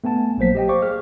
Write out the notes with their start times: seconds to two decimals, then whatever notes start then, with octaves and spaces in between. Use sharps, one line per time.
0.04 A3 B3 G#5 A5
0.38 A#1 F#3 A#3 C5 B6
0.55 G4 D#5 G5
0.69 C5 D5 F5 C#6 D6
0.82 G#4 F6